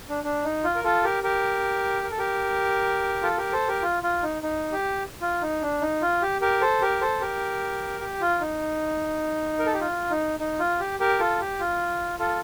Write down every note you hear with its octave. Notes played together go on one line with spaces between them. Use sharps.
D4
D4
D#4
F4
A#4
F4 A4
G4 A#4
G4 A#4
A#4
A4
G4 A#4
F4 A4
G4 A#4
A4 C5
G4 A#4
F4
F4
D#4
D#4
G4
F4
D#4
D4
D#4
F4
G4
G4 A#4
A4 C5
G4 A#4
A4 C5
G4 A#4
G4
F4
D#4
A#4
A4
G4
F4
D#4
D#4
F4
G4
G4 A#4
F4 A4
G4
F4
F4 A4